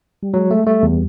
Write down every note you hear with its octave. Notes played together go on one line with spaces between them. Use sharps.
G3
F#3 G#3
A3
G3 A3
E2